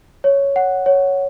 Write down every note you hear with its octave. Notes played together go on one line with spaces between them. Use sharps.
C#5
F#5
C#5